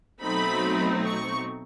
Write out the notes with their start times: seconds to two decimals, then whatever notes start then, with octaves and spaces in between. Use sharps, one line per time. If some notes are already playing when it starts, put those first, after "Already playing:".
0.22 B2 F#3 A3 C4 D#4 B5
1.06 C#6